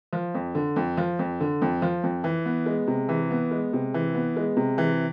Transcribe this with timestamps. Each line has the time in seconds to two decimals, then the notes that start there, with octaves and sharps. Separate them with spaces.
0.13 F3
0.34 F2
0.55 D3
0.76 F2
0.97 F3
1.19 F2
1.40 D3
1.62 F2
1.82 F3
2.03 F2
2.24 E3
2.46 B3
2.66 G#3
2.87 C3
3.09 E3
3.31 B3
3.51 G#3
3.73 C3
3.94 E3
4.14 B3
4.36 G#3
4.57 C3
4.78 E3